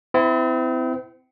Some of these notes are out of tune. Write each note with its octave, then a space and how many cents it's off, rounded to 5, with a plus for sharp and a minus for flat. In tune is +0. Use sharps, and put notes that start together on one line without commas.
C4 -35 E4 +0